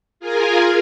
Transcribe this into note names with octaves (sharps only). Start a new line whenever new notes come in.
F4 G#4 A#4 G#5